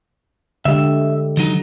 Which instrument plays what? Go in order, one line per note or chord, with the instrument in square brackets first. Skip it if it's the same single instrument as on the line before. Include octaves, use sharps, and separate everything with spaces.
[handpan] D3 G#3 G4 [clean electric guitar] E5
[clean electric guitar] D#3 F#3 D#4